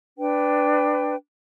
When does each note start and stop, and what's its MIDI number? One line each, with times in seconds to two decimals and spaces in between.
0.18 1.15 62
0.18 1.15 71
0.18 1.15 79